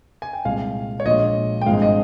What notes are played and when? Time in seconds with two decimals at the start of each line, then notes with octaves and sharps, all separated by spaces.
0.22 G#5
0.33 G5
0.45 C2 A#2 G#3 F5
1.00 C#5
1.05 A#1 A#2 G#3 D#5
1.61 G5
1.66 G#1 G2 F3 G#3 F5
1.82 D#5